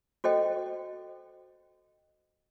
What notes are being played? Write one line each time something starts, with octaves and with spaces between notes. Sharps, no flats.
F#4 A4 C5 D#5 G5